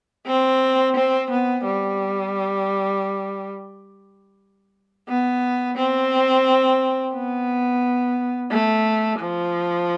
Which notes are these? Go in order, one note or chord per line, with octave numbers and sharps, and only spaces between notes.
C4
C4
B3
G3
B3
C4
B3
A3
F3